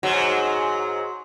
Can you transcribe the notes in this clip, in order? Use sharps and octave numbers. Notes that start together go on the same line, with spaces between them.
G#2 F#3